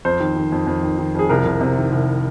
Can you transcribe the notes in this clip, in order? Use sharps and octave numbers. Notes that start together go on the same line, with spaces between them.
F2 C5
D#3
D#3
F2
F2
D#3
D#3
F2 G#4
C2 A#4
C2
C3
D#3
C2